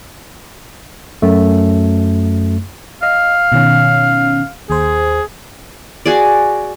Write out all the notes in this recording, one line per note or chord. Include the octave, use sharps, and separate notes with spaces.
F#2 A3
D#5 F5
B2 D#3 C#4
D#2 G#4 C5
F#4 G#4 D5